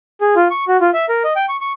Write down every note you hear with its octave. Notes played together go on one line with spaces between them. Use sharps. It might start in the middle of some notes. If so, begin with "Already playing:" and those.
G#4
F4
C#6
F#4
F4
E5
A#4
D#5
G5
C#6
C#6